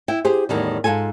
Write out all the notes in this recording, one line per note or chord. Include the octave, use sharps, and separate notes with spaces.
E4 G5
G4 G#4 C5
E2 A2 D#3 G3
G#2 C#3 F4 A4 G#5